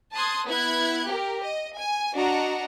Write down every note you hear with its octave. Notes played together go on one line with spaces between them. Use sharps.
A5 C6 D#6 F#6 G#6
B3 E4 F#6 G#6
G4 A#4
D#5
G#5
D4 F#4 D#5 F#5 A#5